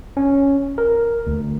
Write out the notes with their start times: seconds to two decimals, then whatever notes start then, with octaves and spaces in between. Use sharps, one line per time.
0.17 C#4
0.78 A#4
1.27 D2